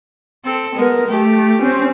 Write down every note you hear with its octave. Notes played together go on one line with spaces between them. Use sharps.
C4 A4
G#3 B3 A#4
A3 G4
C4 C#4